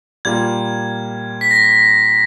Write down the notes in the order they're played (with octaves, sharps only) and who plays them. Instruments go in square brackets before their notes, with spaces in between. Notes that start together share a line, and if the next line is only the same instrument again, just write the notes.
[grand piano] A#2 G3 A#3 [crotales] G#6
[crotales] B6
A#6